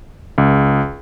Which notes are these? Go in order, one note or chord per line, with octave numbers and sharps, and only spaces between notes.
C#2